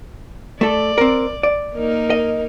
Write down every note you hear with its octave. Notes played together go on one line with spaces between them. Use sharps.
A3 A4 D5
C4 A#4
D5
A#3 D#4 A#4
D#5